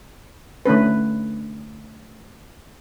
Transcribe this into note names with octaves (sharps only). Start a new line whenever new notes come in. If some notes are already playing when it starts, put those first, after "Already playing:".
D3 A3 C#4 B4